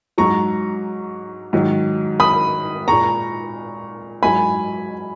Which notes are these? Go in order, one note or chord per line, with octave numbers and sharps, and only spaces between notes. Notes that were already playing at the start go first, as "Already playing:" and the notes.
G#2 F#3 A#5 C#6
G#2 D#3 F#3
B5 D#6
A#2 G#3 A#5 C#6
G#2 F#3 G#5 B5